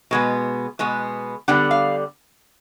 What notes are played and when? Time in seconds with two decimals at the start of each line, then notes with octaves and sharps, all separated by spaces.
0.11 B2 G#3 B3
0.79 B2 G#3 B3
1.48 D3 G3 B3 D4 F#5
1.71 F5